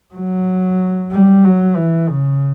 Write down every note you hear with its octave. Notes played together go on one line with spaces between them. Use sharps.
F#3
G3
F#3
E3
C#3